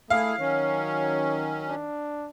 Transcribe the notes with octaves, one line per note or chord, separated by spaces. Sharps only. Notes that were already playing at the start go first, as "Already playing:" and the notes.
A3 E4 G#4 F5
D#3 F#3 C#4 C#5
D4